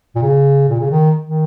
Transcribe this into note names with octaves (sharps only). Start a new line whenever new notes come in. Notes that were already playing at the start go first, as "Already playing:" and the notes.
A#2
C#3
A#2
C#3
D#3
D#3